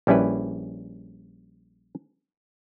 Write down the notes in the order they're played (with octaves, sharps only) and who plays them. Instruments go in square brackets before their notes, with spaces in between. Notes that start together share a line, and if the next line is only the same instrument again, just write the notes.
[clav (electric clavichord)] A#1 G3 C#4 E4 B4